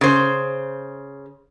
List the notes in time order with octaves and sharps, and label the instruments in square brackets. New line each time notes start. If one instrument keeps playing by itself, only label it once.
[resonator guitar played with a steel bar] C#3 C5